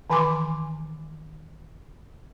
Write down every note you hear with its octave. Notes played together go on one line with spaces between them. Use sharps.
D#3 E3 G#5 C6 D6